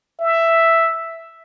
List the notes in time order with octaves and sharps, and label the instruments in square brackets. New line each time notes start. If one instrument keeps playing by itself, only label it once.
[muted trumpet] E5